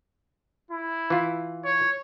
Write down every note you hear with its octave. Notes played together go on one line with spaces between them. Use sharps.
E4
E3 F4
C#5